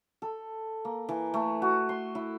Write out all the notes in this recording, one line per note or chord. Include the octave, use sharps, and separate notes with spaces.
A4
A#3
E3
A3
F#4
C6
E4